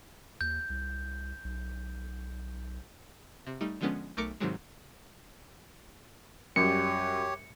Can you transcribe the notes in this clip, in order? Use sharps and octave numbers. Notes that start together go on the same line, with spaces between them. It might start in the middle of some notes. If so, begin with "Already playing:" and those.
D#2 G6
C2
B1
C3
G3 A3 D#4
D3 F3 G#3 B3 C#4
B1 A3 A#4 D6 C#7
G#2 C3 D#3 F#3 G#3
F#2 G3 G4 C#5 C#7